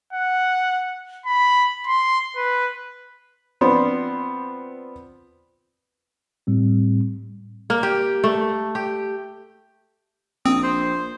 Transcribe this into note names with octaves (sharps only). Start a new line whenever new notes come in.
F#5
B5
C6
B4
F3 B3 C4 D4 C5
A2 G3 C4
A#3
G4
A3
G4
A#1 C4 D#6
C5